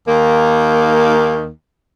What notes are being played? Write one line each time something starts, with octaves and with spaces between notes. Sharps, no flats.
D#2 D#3 A#3